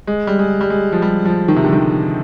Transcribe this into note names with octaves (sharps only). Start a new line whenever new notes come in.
G#3
G3
G#3
G3
G#3
F3
G3
F3
D#3
C3
D3
D#3